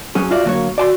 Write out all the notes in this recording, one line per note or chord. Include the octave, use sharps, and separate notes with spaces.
F#3 C#4 G#4
F4 F#4 D5 E5
D3 F#3 A#3 C#5
F#4 D5 G#5 C6